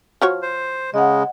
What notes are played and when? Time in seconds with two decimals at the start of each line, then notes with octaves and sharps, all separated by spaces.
0.22 F3 F#4 C#5 F6
0.42 C5
0.94 C#3 G#3 D#5 F#5